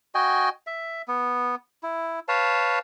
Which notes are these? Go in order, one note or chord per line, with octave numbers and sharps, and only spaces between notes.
F#4 D#5 G5 G#5
E5
B3
E4
B4 C#5 F5 A5